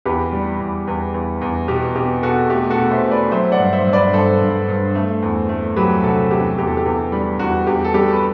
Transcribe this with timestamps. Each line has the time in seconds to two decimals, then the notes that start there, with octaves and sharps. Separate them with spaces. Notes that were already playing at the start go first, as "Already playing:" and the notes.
0.05 E2 G4 B4
0.32 G3
0.59 E2
0.87 E2
1.14 E2
1.41 E2
1.68 B2 G4
1.96 B2 G4
2.23 B2 F#4 A4
2.50 A3 G4
2.70 F#4 A4
2.77 B2
2.91 C5 E5
3.05 A3
3.11 B4 D5
3.32 F#3 C5 E5
3.52 D5 F#5
3.58 G2
3.73 C5 E5
3.87 G2
3.93 B4 D5
4.13 G2 A4 C5
4.41 G2
4.68 G2
4.95 A3
5.22 E2
5.49 A3
5.76 F#3 G4 B4
6.03 C3 F#4 A4
6.31 E2 G4
6.58 E2 G4
6.67 A4
6.77 G4
6.85 E2
7.12 G3
7.39 E2 F#4
7.67 E2 G4
7.85 A4
7.94 G3 G4
8.13 B4